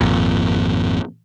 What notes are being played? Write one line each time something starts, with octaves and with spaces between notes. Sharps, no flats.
G#1 F2 A#2